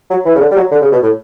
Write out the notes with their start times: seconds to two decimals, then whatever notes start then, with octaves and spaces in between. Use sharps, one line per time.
0.10 F#3
0.25 E3
0.35 C#3
0.40 D3
0.51 G3
0.56 F#3
0.71 D3
0.81 C#3
0.92 B2
1.02 A2